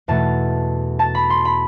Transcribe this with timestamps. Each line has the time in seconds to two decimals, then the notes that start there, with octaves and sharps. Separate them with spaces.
0.08 E2 B2 A3 A5
0.99 A5
1.15 B5
1.30 C6
1.45 B5